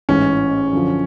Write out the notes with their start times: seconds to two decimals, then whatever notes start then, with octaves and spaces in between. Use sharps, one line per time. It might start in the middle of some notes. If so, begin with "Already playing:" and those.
0.09 A1 G#2 E3 C#4
0.73 F#2 D3 F3